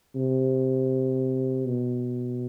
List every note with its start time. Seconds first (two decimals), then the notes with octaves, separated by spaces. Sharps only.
0.16 C3
1.66 B2